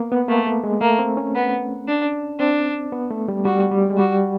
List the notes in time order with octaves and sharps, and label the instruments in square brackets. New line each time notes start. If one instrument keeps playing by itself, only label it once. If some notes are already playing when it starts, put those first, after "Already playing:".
Already playing: [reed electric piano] A#3 B3
B3
[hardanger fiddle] A3 [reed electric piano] A#3
[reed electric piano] A3
G#3
[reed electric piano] A3 [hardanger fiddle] A#3
[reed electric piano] C4
C#4
[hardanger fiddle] B3
D4
[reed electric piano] C4 [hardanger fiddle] D4
[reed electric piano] B3
A3
G3
[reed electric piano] G3 [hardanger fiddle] F#4
[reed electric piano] G3
G#3
[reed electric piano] G3 [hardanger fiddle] F#4